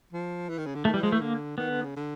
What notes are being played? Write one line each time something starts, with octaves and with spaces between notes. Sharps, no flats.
F3
E3
D#3
C#3
D3
D#3 A3
E3 G3
F3 G#3
E3 A3
D3 A#3
D#3 B3
D3
C#3
D3